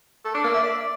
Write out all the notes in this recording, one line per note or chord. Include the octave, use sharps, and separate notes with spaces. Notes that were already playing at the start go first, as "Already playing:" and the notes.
A4
D4
A#3
E5
D5